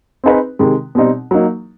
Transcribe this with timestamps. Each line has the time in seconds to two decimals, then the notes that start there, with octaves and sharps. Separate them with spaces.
0.24 C4 D#4 G#4 B4
0.59 C3 D#3 G#3
0.95 B2 G3 C4 D#4
1.31 F#3 A#3 D#4